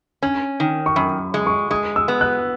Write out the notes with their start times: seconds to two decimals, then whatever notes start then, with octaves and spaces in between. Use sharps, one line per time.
0.23 C#4
0.60 D#3
0.86 C#6
0.96 F#2 B5
1.34 G#3
1.47 C#6
1.71 G#3 D#6
1.96 E6
2.08 B3
2.21 F#6